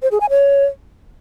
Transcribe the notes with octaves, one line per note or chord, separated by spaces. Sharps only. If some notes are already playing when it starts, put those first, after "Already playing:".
C5
G#4
G#5
C#5